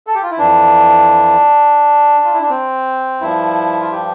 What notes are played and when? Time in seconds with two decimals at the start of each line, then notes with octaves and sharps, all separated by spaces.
0.07 A4
0.15 G4
0.22 F4
0.31 E4
0.38 F2 E3 D4
2.24 F4
2.33 E4
2.41 D4
2.49 C4
3.21 G2 F3 E4
3.81 F4
3.91 G4